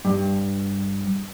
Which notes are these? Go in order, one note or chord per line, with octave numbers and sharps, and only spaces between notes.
G2